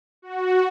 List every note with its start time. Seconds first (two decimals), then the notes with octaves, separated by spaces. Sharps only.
0.22 F#4